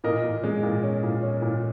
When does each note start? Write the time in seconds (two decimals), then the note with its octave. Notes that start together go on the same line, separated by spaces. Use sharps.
0.04 A#2 A#4 D#5
0.24 A#2
0.44 G#3
0.63 A#2
0.83 C#4
1.03 A#2
1.22 C#4
1.42 A#2